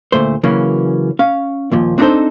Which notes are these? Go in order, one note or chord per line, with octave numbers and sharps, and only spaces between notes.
D2 A#2 A3 C5
C#3 E3 F#3 A#3 C#4
C#4 F5
D#2 A#2 F3
C4 D4 D#4 F4 A4 C5